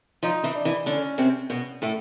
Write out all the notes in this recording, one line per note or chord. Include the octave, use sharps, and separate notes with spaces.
F3 D#4 F4
E3 E4
D4
E3 E4
D3 C#4 D4
C3 C4
B2 B3
A2 A3